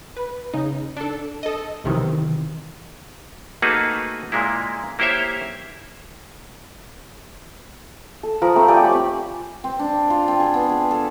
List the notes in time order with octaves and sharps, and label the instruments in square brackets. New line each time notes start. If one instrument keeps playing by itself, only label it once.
[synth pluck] B4
C#3 D#4
D4 A4
A4 D#5
B1 C3 D#3 E3
[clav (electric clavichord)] A3 A#3 D#4 F#4 G#4 B4
A#2 G#3 A#3 E4
A#3 E4 G4 C5 C#5 E5
[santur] A4
F3 A#4 B5 D#6
A3 C4
G4 D5 G5 G#5
C#5 B5 D6
[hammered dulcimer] C4
D4
F4
C4
G#4
B3
G#4
A4